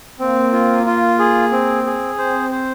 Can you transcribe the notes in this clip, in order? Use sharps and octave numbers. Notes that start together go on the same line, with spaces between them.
A#3 C4
F4
F4
G#4
C4
G#4
C4 C5
C5